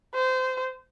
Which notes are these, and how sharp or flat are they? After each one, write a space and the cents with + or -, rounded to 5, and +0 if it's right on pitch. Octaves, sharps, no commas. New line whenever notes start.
C5 -20